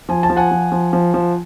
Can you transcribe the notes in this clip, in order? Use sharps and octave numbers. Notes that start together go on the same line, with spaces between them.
F3 G#5
A5
F3
F#5 G#5
F3
F3
F3
F3